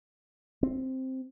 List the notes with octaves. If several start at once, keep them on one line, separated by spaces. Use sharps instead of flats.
C4